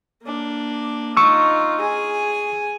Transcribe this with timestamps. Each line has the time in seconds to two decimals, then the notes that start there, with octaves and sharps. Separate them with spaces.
0.22 A#3 D4
1.17 D#4 F4 C#6 E6
1.80 G#4 G#5